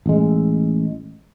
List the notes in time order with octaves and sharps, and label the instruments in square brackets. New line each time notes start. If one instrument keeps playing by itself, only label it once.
[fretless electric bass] A1 G#3